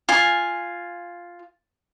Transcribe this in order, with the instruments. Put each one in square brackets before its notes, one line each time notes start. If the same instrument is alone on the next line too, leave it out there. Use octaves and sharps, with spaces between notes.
[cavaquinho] F4 G#5